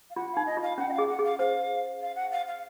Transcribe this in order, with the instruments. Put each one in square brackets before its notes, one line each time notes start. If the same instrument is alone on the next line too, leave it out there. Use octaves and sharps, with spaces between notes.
[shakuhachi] F5
[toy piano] F4 [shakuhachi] F#5
[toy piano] D#4 [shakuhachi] F5
[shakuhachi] D#5
[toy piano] F4
[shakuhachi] F5
[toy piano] C#4 [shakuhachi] F#5
[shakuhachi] D#5
F5
[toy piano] G#4
[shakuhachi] F#5
[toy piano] G#4
[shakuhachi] F5
[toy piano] C5 [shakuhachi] F5
[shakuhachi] F5
F#5
F5
F5